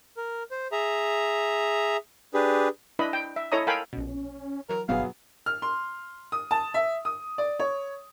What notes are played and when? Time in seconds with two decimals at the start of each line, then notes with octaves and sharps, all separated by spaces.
0.17 A#4
0.51 C5
0.72 G#4 E5 A#5
2.34 D4 G4 G#4 B4
2.99 D4 E4 B4 D#5 B5
3.13 G5
3.36 E5
3.52 E4 A4 C#5 D#5 A#5 D#6
3.67 A4 A#4 F5 G5 G#5 B5
3.93 A#1 B2 C#4
4.69 E3 F#3 A#4
4.89 F#1 G2 B2 E3 F#3 B3 G#4 F5
5.46 F6
5.62 C6
6.32 D#6
6.51 A5
6.74 E5
7.05 D#6
7.38 D5
7.60 C#5